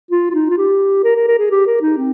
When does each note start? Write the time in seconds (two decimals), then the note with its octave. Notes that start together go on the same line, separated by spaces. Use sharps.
0.11 F4
0.31 F4
0.35 D#4
0.50 F4
0.58 G4
1.04 A#4
1.16 A#4
1.28 A#4
1.39 G#4
1.51 G4
1.67 A#4
1.82 D#4
1.97 C4